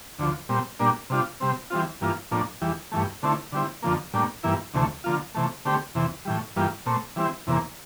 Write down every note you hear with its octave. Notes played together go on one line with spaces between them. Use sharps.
D2 D3 F3
A#2 G3 C4
A#2 G3 A#3 D4
C3 G3 D4 F4
C3 G3 C4
E3 G3 C4 F4
G2 E3 A#3 F4
A2 F3 A#3 D4
E2 E3 G3
G2 E3 A3
D3 A3 C4 E4
D3 G3 C4 E4
F2 D3 F3 A#3
A2 G3 A#3 D4
G2 E3 A#3 E4
D2 C3 E3 A3
D3 F3 A#3 F4
C3 E3 A3
D3 A3 C4 G4
E2 C3 E3
A2 E3 G3
G2 E3 G3 A#3 F4
A#2 A3 C4
E3 G3 C4 E4
E2 C3 E3 A#3